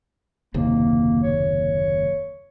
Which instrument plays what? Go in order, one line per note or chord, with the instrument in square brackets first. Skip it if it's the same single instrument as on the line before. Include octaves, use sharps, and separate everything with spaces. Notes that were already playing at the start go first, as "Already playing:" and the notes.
[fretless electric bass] F#1 D#2 C3 [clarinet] A#3
[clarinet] C#5